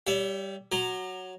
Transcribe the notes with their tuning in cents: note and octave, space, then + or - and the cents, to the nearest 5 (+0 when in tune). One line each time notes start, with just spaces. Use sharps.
G3 +0 C#5 +35 E5 +20
F#3 +0 A#5 +0 D6 +45